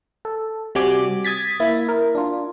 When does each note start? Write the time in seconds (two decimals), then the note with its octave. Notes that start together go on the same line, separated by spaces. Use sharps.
0.25 A4
0.75 C3 G3 F#4 G#5 D6
1.25 D#6 G#6 A6 B6
1.60 A#3 E4
1.89 A#4
2.15 D4 F4